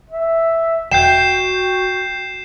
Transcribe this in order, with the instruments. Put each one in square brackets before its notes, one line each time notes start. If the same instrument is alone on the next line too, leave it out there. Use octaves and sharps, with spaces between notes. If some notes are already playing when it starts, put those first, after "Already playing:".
[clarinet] E5
[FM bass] E1 [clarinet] F#4 [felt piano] G5 [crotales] G6 C7 E7